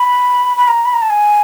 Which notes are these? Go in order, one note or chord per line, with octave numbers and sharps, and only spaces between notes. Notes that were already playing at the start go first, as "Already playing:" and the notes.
Already playing: B5
B5
A#5
B5
A#5
A5
G#5